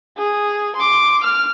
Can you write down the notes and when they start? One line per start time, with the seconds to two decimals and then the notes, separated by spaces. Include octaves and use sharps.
0.17 G#4
0.76 C6 D6
1.23 F6